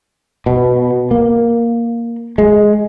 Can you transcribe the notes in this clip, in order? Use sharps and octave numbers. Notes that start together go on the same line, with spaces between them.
B2
A#3
G#3